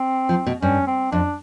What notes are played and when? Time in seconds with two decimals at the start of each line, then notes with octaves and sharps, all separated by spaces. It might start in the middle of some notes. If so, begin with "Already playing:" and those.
Already playing: C4
0.29 F3
0.46 B2
0.62 G2 C#4
0.87 C4
1.12 F2 D4